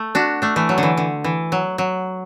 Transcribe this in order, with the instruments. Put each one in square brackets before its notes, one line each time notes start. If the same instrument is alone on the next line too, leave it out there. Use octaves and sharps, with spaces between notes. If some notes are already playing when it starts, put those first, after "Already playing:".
Already playing: [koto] A3
D4 F#4
A3 D4
E3 A3
F#3
D3
E3
D3
E3
F#3
F#3